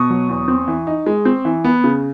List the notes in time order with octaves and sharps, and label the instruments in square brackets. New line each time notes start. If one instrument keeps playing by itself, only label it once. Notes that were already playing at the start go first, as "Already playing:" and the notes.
Already playing: [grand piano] B2 C#6 D#6
F#3
E2
C4
E3
D#4
G#3
C4
E3
B3
C#3